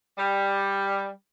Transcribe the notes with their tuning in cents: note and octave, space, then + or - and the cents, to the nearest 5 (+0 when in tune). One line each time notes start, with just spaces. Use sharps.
G3 +10